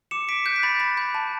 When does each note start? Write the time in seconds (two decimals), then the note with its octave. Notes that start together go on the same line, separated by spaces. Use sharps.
0.11 D6 C#7 E7
0.28 D6 B6 D7
0.46 F#6 G6 B6
0.56 B6
0.63 B5 A6
0.80 B5 A6
0.97 B5 G6
1.15 A5